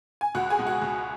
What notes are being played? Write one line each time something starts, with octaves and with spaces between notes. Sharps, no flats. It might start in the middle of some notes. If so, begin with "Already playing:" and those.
G#5
C#2 F#4 F#5
G#4 G#5
B2 G#3
F#4 F#5
C#2